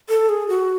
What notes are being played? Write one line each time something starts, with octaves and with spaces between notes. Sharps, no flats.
A4
G#4
F#4